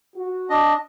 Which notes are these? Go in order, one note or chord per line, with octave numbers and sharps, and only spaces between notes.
F#4
D4 D#5